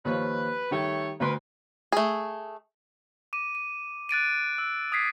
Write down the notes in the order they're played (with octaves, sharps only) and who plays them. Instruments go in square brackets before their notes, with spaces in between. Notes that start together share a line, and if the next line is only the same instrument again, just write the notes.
[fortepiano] D#2 F3 C#5 [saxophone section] B4
[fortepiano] D#3 G3 G5 [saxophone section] A3 C#5
[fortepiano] D2 C6 [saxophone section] A#4 B4
[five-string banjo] A3 G#4
[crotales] D6 D#7
D#7
F#6 A6 D7 D#7
E6
D#6 G#6 B6 C7